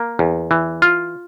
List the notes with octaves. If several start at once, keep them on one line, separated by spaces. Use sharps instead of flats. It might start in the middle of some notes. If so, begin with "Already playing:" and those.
Already playing: A#3
E2
E3
F4